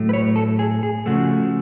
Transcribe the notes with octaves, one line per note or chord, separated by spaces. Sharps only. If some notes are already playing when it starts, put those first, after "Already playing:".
Already playing: A2 F#3 A3
B4
C#5
A4
G#4
G#4
C#3 F3 A3 F#4